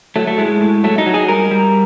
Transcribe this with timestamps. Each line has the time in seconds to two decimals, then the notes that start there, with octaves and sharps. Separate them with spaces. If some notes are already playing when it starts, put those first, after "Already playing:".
0.16 F#3 A3
0.27 A3
0.38 A2 G#3
0.61 A2
0.84 F#3 A3
0.98 D#4
1.06 F#3
1.14 G#4
1.28 G3 A#4
1.51 G3